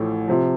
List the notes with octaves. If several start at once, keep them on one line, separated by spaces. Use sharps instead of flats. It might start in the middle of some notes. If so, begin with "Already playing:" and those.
Already playing: A1 A2 F3
C3 F3